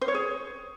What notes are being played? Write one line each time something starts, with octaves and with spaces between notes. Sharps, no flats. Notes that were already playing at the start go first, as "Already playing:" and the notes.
C5
C#5
G#4